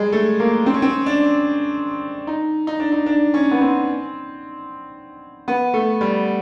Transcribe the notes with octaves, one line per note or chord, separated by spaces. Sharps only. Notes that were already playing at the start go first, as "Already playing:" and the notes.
Already playing: G3 G#3
A3
A#3
C4
C#4
C4
D4
D#4
D#4
D4
D#4
D4
C#4
B3
C4
B3
A3
G3